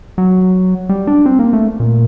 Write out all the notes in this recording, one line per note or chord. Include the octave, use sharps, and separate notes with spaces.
F#3
G3
D4
C4
A#3
A3
A#2